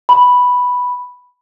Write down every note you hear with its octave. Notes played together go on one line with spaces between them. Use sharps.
B5